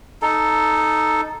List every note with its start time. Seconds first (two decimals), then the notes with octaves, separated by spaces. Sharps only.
0.22 D#4 A4